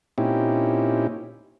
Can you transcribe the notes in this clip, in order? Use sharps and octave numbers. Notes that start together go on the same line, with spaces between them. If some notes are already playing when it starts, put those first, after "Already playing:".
A#2 C4 C#4 D#4 E4 G4